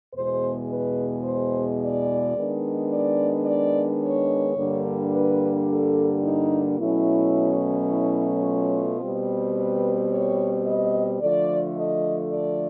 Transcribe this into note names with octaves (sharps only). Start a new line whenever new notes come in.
E2 B2 G#3 C5
B4
C5
D5
D#3 G#3 B3 D4
D5
D5
C#5
G2 D3 G3 A#3 D4
B4
A4
D#4
B2 F#3 A3 C#4 E4
E4
F4
B2 G3 C4
B4
C#5
D#5
D3 F3 A3 D5
D#5
D5